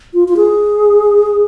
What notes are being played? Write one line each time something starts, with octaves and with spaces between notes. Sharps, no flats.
F4
F4
G#4